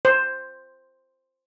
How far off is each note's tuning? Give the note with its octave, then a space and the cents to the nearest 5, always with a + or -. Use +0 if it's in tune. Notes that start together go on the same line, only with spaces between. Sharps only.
C5 +5